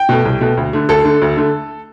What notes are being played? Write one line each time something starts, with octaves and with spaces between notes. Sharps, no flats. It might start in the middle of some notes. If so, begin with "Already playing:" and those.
Already playing: G5
B2 A3
C2
B2 A3
D2
D3 A3
D2 A4
D3 A3
D2
D3 A3